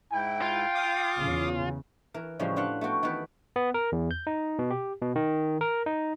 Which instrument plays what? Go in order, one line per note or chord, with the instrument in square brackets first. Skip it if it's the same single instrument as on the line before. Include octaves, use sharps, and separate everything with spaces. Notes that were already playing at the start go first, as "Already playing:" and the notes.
[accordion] G#2 E4 [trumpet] G5
[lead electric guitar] F4
[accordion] F5 D6 D#6
[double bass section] E2 C#3
[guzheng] E3 A#4
A2 C#3 E3 F3 G3 G#3
D4 F4 B4 F5 F#5
A3 B3 F#4 G5
D#3 E3 A3 B3 B4
[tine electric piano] B3
A#4
E2
G6
D#4
B2
G4
B2
D#3
A#4
D#4